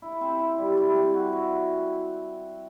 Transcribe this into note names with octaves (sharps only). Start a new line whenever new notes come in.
E4
C4
E4
G3
E4
C4
F#4
F#4